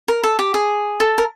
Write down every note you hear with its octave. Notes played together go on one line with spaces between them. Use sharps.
A#4
A4
G4
G#4
A4
A#4